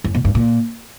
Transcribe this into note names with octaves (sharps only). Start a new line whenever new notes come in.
F#2
B2
G2
A#2